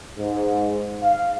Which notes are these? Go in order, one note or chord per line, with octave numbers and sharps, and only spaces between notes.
G#2
F5